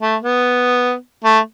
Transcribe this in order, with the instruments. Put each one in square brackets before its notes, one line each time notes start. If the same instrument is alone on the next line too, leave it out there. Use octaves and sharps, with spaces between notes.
[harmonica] A3
B3
A3